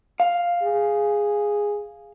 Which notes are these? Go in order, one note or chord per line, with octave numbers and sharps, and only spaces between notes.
F5
G#4